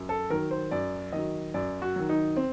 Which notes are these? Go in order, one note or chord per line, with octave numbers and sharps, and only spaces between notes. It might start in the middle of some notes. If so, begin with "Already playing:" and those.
Already playing: F#2
A4
D#3 F#3 A#4
C5
F#2 D5
D#3 F#3 D#5
F#2 D5
F#4
D#3 F#3
D#4
C4